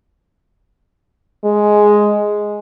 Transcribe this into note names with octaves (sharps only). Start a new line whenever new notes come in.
G#3